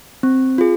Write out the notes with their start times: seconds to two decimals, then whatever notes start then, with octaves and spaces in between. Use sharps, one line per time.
0.23 C4
0.58 F4 G#4